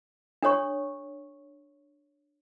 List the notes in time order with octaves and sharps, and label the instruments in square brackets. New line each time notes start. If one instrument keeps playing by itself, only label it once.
[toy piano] D4 A4 C#5 C#6